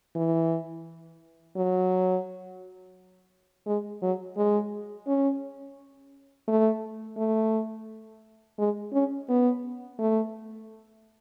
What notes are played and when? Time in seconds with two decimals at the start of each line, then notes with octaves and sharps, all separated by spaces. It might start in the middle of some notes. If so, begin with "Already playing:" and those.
0.16 E3
1.56 F#3
3.67 G#3
4.02 F#3
4.37 G#3
5.07 C#4
6.48 A3
7.17 A3
8.58 G#3
8.93 C#4
9.29 B3
9.99 A3